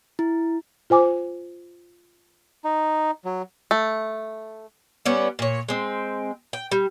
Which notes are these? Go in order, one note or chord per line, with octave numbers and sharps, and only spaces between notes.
E4
F4 C5 G#5 D6
D#4
F#3
A3
G3 B3 C#4
A#2 C#5
G#3 C4
G5
G3